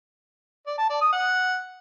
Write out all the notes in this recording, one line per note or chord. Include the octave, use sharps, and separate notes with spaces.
D5
A5
D5
D#6
F#5